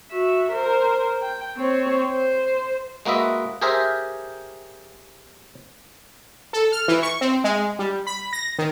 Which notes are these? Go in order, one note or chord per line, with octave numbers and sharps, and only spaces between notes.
F#4 E5
A#4 C5
G5
C4 C#5
C5
G#3 A#3 F#4 B4 D#5 E5
G4 G#4 A#4 C5 E5
A4
F6
E3
C#6
C4
G#3
G3
B5
A#6
D#3